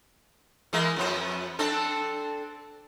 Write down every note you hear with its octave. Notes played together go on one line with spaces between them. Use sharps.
E3 G#3 A#3
F2 B3 C5
C4 D4 A4